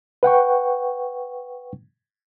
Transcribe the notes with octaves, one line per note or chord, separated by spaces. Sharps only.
B4 F#5 G5 C#6